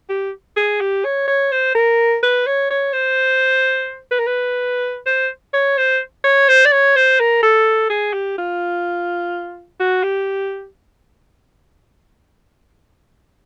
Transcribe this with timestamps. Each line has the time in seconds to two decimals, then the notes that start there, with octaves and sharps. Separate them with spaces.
0.10 G4
0.57 G#4
0.81 G4
1.05 C#5
1.28 C#5
1.52 C5
1.75 A#4
2.23 B4
2.47 C#5
2.70 C#5
2.93 C5
4.11 B4
4.19 A#4
4.27 B4
5.06 C5
5.54 C#5
5.78 C5
6.24 C#5
6.49 C5
6.65 D5
6.72 C#5
6.96 C5
7.20 A#4
7.43 A4
7.90 G#4
8.14 G4
8.38 F4
9.80 F#4
10.03 G4